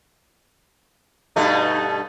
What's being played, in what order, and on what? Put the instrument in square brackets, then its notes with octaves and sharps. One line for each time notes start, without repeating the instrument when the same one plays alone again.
[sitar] G2 B2 A3 [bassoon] D#4